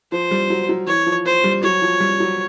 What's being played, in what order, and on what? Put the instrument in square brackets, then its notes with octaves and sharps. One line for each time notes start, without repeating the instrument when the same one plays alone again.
[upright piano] F3 [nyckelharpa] C5
[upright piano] G3
F#3
F#3
[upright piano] E3 [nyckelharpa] C#5
[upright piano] F3
[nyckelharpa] C5
[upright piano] G3
[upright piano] F#3 [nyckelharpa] C#5
[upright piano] F3
G3
F#3